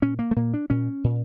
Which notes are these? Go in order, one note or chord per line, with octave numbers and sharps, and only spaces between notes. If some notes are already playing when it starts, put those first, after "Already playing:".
A#2 C#4
A#3
A3
A#2 A#3
D4
A#2 C#4
A#2